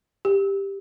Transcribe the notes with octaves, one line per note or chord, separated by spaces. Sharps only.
G4